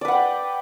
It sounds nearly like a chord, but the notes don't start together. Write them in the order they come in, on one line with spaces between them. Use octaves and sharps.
D5 B4 F#5 G5